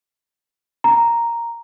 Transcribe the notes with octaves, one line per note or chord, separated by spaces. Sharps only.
A#5